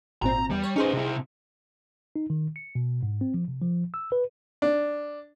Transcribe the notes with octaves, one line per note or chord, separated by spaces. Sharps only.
G#1 A#2 C4 A#5
E2 G3
C#5
C#4 D#4 G#4 B4 C5
C3 E4
D#4
D#3
C#7
B2
G#2
C4
F3
C3
F3
E6
B4
D4